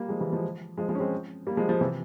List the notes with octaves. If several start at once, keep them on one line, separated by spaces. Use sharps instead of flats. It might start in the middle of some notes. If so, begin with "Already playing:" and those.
Already playing: G3 A#3
F3 G#3
E3 G3
F3 G#3
F3 G#3
F3 G#3
C#4
G#3 C4
G3 A#3
F3 G#3
F3 G#3
C3 E3